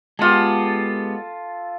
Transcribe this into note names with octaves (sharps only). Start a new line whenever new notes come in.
G#3 B3 F4 G4 A4